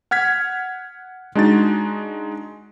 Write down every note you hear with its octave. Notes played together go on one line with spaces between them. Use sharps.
F#5 F6 G#6 B6
G#3 D4 D#4 F#4 A6